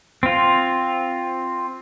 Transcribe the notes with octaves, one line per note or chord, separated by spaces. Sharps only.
C4 F4